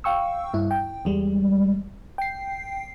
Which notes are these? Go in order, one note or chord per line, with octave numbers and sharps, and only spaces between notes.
F5 G5 C#6 E6
G2 E4
G5
E2 G3 G#3
G5 C7